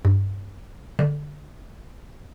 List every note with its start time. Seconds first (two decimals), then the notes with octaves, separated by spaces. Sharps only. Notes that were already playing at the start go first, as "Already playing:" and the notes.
0.05 G2
0.99 D3